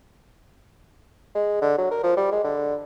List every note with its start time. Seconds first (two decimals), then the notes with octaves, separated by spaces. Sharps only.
1.35 G#3
1.62 D3
1.78 F#3
1.91 A#4
2.04 F3
2.17 G3
2.32 G#3
2.44 D3